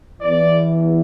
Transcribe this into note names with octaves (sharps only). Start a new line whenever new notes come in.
E2 E3 D5